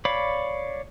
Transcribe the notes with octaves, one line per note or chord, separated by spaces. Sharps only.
C#5 D5 F5 B5